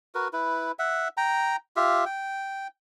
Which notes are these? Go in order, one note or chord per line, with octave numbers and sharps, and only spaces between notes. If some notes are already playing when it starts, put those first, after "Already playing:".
F#4 A#4 B4
E4 B4
E5 F#5
G5 A#5
F4 G4 E5 F5
G5